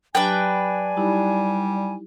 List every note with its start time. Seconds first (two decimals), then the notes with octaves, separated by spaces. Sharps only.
0.15 F#3 D4 G4 B4 G5 G#5
0.97 G3 D#4 E4 G4